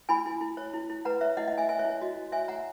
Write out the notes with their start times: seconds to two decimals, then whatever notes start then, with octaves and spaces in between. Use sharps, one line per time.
0.09 E4 G#5 B5
0.26 E4
0.41 E4
0.57 C#5
0.74 E4
0.90 E4
1.05 B4 F#5 A#5
1.21 B4 C#5 E5
1.37 E4 D#5 F#5
1.48 D#5 F#5
1.52 E4
1.58 E5 G#5
1.69 C#5 E5 G#5
1.79 C#5 E5
1.84 E4
1.90 C#5
2.01 F#4 D#5
2.16 F#4
2.32 C#5 E5 G#5
2.48 C#5 F#5 A#5